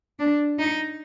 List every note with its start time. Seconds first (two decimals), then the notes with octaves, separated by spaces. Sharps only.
0.19 D4
0.59 D#4